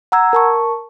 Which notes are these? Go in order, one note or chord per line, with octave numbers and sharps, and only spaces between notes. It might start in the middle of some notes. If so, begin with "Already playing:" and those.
F#5 A#5 E6 G#6
A#4 A5 C#6